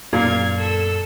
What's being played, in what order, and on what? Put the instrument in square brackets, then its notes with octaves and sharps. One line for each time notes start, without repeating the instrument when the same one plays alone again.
[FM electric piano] F#2 [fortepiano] A#2 [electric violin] F5 G#6
[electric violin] A4 E6